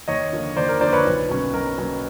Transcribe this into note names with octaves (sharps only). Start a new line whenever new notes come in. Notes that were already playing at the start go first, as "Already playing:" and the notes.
D#2 C#5 D#5
D3 F3 A#3
D#2 C5 D5
A#4
D3 F3 A#3 C5 D5
B4 C#5
B1
B2 F#3 A#3 C#4
B1 A#4
B2 F#3 A#3 C#4